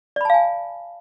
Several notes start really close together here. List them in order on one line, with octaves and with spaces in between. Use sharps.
D5 B5 A5 F5 G#5